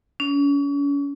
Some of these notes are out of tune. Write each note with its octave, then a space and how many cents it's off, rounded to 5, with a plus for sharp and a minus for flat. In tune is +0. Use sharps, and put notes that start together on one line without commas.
C#4 +40